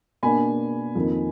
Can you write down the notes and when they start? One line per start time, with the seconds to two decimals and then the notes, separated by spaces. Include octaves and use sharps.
0.23 B2 A#3 D4 G#5 B5
0.95 F2 D#3 A#3 D#4